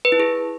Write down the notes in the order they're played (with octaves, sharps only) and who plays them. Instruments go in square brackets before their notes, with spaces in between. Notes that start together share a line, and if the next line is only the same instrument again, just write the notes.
[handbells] B4
E4
G#4